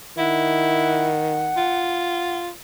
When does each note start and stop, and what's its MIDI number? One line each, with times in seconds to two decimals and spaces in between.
0.18 1.71 51
0.18 1.08 64
0.18 2.39 78
1.57 2.50 65